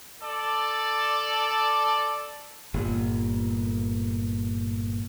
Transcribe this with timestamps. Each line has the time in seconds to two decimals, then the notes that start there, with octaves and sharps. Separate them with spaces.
0.22 A4 D5
2.74 G1 A#2